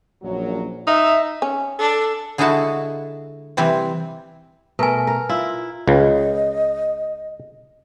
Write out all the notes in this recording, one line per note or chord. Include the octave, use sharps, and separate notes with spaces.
A#1 F#2 F#3
D#4 E5
C#4
D4 A4
D3 G#3 D#4 E4 F#4 A5
C3 E3 G3 C4
B2 A3 A#4 B4 G#5
A#4
E4 F4
C#2 D#5